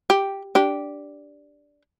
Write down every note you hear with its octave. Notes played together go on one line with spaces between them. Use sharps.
G4
D4 G4